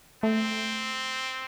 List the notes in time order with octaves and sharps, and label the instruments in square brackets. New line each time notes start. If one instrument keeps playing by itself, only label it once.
[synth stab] A3 [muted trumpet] C4